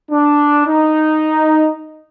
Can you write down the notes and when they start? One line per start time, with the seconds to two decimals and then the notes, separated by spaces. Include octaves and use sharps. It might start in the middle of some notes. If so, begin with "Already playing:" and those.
0.11 D4
0.67 D#4